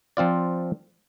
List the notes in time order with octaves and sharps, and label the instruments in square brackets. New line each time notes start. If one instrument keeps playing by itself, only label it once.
[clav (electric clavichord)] F3 C4 F4 D5